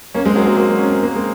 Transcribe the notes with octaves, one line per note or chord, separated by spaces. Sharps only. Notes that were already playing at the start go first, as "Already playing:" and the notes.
A#3 C#4
G#3 C4
F#3 A#3
F#3 A#3
F#3 A#3
C#4
C4
A#3
G#3 C4